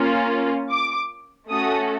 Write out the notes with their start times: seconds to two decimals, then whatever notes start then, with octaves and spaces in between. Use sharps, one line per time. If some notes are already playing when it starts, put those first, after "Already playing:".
Already playing: A#3 C#4 F4
0.72 D6
1.49 A3 C#4 F#4 A4 D#6